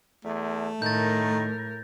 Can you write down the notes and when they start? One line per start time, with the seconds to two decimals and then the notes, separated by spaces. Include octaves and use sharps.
0.25 E2 A3
0.82 A2 D#3 A#4 G6 A6